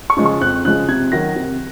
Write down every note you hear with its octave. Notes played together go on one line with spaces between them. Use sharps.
C#6
C#3 F3 G#3
C#6
F2 F#6
C#3 F3 G#3 F#6
C3 G#6
D#3 F#3 A#6
C3